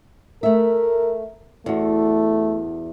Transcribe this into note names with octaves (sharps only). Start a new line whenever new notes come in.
A3 A#4 E5
E2 A3 F#4